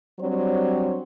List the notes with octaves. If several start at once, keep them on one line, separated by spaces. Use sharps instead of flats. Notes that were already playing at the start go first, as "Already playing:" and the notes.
F#3 G3 C4 D4 C5 C#5